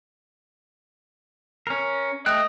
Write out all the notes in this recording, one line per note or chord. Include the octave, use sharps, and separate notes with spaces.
C#4 A#4
A3 D#5 G5 F#6